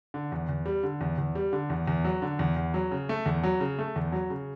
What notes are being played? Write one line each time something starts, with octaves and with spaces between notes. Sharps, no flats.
D3
E2
E2
G3
D3
E2
E2
G3
D3
E2
E2
F#3
D3
E2
E2
F#3
C#3
A3
E2
F#3
C#3
A3
E2
F#3
C#3